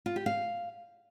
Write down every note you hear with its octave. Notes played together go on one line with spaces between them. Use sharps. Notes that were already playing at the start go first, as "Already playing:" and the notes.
F4
G4
F5